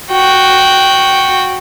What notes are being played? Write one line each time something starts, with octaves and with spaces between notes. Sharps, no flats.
F#4 G5